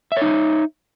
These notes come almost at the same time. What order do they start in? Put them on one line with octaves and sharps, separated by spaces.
E5 C#5 D#4